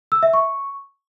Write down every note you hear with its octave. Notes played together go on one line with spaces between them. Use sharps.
E6
E5
C#6